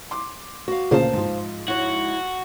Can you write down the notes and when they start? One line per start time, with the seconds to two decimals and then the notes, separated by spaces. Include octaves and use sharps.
0.11 C6 D6
0.68 F#4 F5
0.91 D2 A#2 C#3 A#3 C5 F5 A5
1.13 G#2 F3
1.68 E4 F#4 C#5